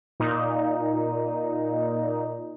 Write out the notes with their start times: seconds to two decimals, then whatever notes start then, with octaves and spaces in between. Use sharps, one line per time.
0.20 A#2 D#4